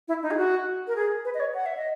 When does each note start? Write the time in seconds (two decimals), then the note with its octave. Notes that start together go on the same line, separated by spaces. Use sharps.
0.08 E4
0.23 D#4
0.31 G#4
0.37 F#4
0.87 A#4
0.96 G#4
1.25 B4
1.34 D#5
1.40 C#5
1.54 F#5
1.66 E5
1.77 D#5